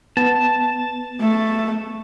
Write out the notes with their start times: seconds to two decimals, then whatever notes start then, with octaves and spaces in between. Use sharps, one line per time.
0.17 B3 A5
1.21 A3